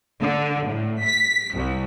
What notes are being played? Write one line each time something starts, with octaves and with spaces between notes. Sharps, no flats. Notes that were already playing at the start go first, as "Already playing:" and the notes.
D3
A2
B6
C2